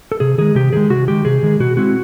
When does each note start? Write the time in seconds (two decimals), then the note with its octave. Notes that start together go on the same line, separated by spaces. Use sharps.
0.12 A4
0.20 C3 G#4
0.38 D#3 G#3 G#4
0.55 C3 G4
0.73 D#3 G#3 G#4
0.90 C3 F#4
1.08 D#3 G#3 G4
1.25 C3 G#4
1.43 D#3 G#3
1.60 B2 F#4
1.77 G#3 C4 E4 F#4